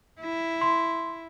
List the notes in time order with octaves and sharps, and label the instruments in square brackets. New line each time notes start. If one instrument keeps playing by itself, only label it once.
[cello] E4
[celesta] C6